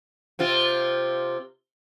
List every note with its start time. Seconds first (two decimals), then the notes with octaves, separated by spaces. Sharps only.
0.39 C3 C4 F4